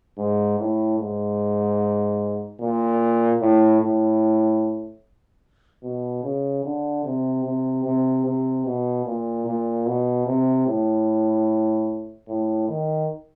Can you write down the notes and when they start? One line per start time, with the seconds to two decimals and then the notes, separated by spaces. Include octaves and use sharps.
0.18 G#2
0.59 A2
0.99 G#2
2.61 A#2
3.41 A2
3.81 A2
5.83 B2
6.23 C#3
6.64 D3
7.05 C3
7.45 C3
7.85 C3
8.26 C3
8.66 B2
9.06 A#2
9.46 A#2
9.86 B2
10.26 C3
10.68 A2
12.29 A2
12.69 D#3